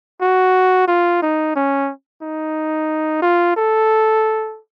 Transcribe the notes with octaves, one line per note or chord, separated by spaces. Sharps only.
F#4
F4
D#4
C#4
D#4
F4
A4